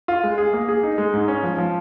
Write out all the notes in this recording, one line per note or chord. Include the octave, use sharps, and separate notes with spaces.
F4
G#3
G#4
A#3
G#4
D#4
G#3
G#2
C#4
F3
F3